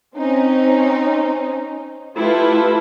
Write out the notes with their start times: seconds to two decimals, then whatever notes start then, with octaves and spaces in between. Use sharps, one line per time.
0.17 C4 C#4 D#4
2.17 A3 E4 F4 G4 A4 B4